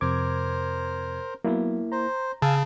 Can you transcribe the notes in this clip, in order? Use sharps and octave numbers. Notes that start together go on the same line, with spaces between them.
F2 C3 A#4 C5 D6 G#6
F#3 A#3 B3 E4
C5 A#5
C#3 F5 G#5 A5 E6